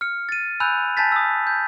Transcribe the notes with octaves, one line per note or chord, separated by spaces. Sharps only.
F6 C#7
A6 D#7
G#5 B5 E6 F#6 G6 F7
G#5 A5 G6 A6 B6
D#6 E6
G6